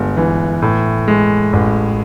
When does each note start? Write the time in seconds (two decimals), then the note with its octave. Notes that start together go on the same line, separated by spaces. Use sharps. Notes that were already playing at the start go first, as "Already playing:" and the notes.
Already playing: G1 G2 G#3
0.17 E3
0.62 A2
1.08 G#3
1.53 A1